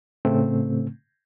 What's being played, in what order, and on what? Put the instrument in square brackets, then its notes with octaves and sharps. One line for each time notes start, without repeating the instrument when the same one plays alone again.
[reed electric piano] A2 C#3 A3 C4